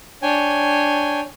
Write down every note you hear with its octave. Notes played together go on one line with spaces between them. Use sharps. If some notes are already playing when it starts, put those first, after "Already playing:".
D4 C#5 G5 G#5